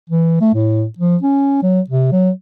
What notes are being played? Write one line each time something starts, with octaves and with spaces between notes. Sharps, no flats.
E3
A3
A2
F3
C#4
F#3
C3
F#3